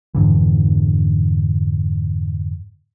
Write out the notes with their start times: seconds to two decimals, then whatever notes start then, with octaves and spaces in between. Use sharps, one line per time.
0.15 F2 G#2 D3 E3